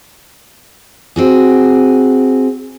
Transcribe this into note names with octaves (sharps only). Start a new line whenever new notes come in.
C4 F#4 G#4